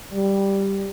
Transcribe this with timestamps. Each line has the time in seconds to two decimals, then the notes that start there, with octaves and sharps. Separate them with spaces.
0.13 G3